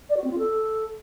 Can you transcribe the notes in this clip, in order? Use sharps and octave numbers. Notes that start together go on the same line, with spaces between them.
D5
F#4
C4
F4
A4